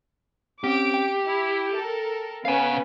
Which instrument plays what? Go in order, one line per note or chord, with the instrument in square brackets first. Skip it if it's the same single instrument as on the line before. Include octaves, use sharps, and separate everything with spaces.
[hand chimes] C4 C#4 [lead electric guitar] G4 [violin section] D6 D7
[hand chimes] G5
[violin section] E4
A4 A#4
[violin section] B3 C#4 B4 [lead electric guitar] F5 G#5